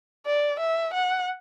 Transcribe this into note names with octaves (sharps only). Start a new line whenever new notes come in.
D5
E5
F#5